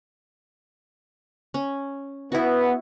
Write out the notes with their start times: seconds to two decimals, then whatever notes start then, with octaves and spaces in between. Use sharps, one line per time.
1.54 C#4
2.32 B3 E4 F#4